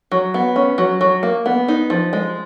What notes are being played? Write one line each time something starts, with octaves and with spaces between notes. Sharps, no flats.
F#3
B3
C#4
F#3
F#3
A#3
B3
D#4
F3
G#3